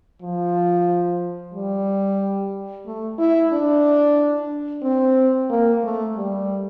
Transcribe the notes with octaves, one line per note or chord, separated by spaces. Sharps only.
F3
G3
A3
E4
D4
C4
A#3
A3
G3